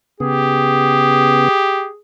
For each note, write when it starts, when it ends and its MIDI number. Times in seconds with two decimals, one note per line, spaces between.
0.20 1.48 49
0.20 1.48 59
0.20 1.90 67
0.20 2.00 68